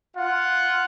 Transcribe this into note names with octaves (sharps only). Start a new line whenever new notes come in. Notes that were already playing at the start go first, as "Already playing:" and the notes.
F4 F#5